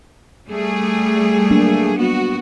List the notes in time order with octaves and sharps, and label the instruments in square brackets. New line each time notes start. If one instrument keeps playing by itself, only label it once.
[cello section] G3 A3 G#4
[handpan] F#3 A#3 D4
[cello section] B3 F#4